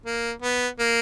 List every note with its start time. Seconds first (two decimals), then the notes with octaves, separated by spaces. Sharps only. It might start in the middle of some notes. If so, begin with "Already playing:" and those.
0.06 A#3
0.42 B3
0.79 A#3